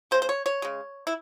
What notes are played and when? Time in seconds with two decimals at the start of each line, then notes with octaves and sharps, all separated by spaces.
0.11 C#3 G#3 C5
0.22 C5
0.29 C#5
0.46 C#5
0.62 C#3 G#3
1.07 E4